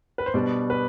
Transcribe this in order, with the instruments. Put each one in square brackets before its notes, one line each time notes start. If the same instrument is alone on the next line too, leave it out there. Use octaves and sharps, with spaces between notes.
[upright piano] B4
C5
B2 G3 B3 D4 D5
B4